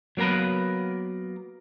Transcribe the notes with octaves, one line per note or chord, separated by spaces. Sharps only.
F#3 A#3 B3 A#4 B4